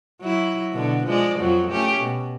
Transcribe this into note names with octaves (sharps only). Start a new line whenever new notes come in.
F#3 E4
B2 D3
F3 G#3 D5
F2 F3 F#3
A3 C#4 G4
B2